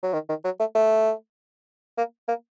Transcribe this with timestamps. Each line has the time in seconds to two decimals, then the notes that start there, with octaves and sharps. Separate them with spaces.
0.03 F#3
0.13 D#3
0.29 D#3
0.44 F#3
0.60 A3
0.75 A3
1.98 A#3
2.28 A#3